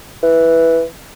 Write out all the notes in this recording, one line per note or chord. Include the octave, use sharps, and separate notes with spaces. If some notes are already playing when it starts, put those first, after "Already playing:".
E3